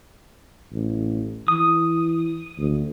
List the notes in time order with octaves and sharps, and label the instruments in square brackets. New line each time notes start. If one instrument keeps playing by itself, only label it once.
[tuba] A1
[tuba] E3 [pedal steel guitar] D#6
[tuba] D2